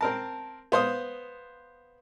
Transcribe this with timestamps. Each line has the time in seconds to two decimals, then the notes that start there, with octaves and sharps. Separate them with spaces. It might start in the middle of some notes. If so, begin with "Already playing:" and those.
0.01 C4 A#4 A5
0.72 B3 C5 F5 D#6